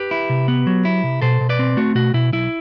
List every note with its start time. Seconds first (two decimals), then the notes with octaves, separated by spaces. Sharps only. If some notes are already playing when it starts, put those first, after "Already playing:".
Already playing: G4 B4
0.11 E4
0.29 C3
0.48 B3
0.67 F#3
0.85 E4
1.04 C3
1.22 B2 A4 C5
1.41 B2
1.49 B4 D5
1.59 C4
1.77 A3 F#4
1.95 B2 F#4
2.14 B2 E4
2.33 B1 E4